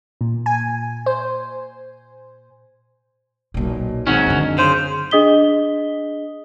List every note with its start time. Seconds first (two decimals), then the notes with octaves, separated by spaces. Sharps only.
0.21 A#2
0.46 G#5
1.06 C5
3.54 B1 A#2
4.07 G#2 D#3 F#3 C4 C#4 D#4
4.26 F#2 D3
4.58 C#3 C5
5.11 D4 G#4 D#5 D#6 B6 G7